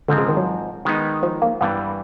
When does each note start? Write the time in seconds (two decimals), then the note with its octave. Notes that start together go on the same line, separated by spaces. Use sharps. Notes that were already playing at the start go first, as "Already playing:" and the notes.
0.08 G#2 D3 F3 G#3 C4
0.18 C#3
0.29 D#3
0.37 F#3
0.85 D#3 G#3 B3 D#4
1.23 F3
1.42 A#3
1.61 G2 E3 G3 B3